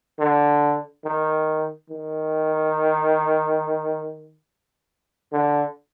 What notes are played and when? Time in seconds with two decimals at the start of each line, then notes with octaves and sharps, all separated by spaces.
0.19 D3
1.05 D#3
1.90 D#3
5.32 D3